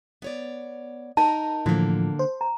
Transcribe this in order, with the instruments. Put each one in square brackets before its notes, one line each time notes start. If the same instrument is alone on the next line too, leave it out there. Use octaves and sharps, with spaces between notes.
[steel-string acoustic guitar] B3 C#5 D5
[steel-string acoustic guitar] D#4 A#4 [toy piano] A5
[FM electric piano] A2 E3 F3 [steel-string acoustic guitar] D3 A#3
[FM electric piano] C5
[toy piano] A#5